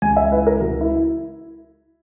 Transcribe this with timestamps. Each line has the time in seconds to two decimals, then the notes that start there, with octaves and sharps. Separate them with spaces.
0.02 C#2 G#5
0.17 E5
0.31 E4 B4
0.47 A#4
0.61 C#2 F#4
0.81 E4